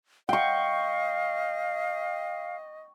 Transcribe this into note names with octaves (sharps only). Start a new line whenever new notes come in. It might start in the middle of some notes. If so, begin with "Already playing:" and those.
D#5 F5 G5 C#6